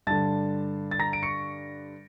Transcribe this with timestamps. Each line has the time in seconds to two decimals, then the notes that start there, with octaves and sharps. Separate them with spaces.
0.07 G2 D3 A5 A6
0.91 A6
0.99 A#5 A#6
1.13 D7
1.23 C#6 C#7